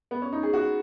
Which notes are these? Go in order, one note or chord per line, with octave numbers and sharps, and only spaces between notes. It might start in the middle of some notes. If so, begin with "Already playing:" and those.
B3
C#4
D#4
G#4
F#4